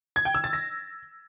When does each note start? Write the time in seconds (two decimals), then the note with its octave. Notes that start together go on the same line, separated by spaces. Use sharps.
0.16 G#6
0.25 G5
0.35 E6
0.44 A6
0.53 A#6